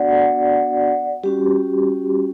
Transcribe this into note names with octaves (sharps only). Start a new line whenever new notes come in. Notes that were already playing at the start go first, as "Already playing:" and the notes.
Already playing: B3 D4 F#4 D5 F#5
G3 C#4 F#4 G4